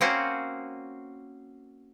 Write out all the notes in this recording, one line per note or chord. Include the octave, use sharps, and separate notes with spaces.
A#3 C4 C#4 F#4 C5